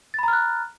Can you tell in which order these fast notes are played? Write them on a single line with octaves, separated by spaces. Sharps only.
A6 B5 A#5 F6 F#6